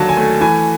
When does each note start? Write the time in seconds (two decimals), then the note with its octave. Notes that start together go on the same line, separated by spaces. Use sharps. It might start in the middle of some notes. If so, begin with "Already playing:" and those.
Already playing: D#2 D3 F#3 A5
0.09 G#5
0.17 A3
0.41 E3 G#5